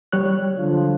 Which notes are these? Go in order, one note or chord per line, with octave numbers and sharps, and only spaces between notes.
G3 C#5 F#6
D3 F3 F4